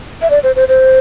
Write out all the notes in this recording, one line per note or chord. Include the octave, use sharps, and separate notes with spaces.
E5
D5
C5
C5
C5